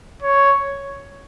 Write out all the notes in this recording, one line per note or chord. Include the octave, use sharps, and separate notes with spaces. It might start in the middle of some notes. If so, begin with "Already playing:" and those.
C#5